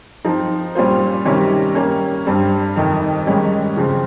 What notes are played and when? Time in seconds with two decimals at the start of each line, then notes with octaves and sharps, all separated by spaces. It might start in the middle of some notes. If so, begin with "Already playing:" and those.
0.25 F3 C4 D#4
0.75 A#2 G3 C#4 F4 C5
1.25 C3 D#3 G3 C#4 G4
1.75 G3 A#3 C#4
2.26 G2 G3 C4
2.76 F2 C3 D#3
3.26 G#2 D#3 G3 C#4 G4
3.77 C#3 F3 C4